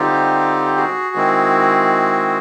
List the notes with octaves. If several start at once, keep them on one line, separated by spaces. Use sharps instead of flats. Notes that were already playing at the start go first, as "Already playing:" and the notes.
Already playing: D3 G3 C4 D#4 F4 G4
F#4 G#4
D#3 G#3 C4 E4